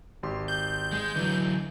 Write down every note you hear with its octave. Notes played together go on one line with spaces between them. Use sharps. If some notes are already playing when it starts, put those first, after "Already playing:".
G#1 G4 C6
G6
G#3
D3 E3 F#3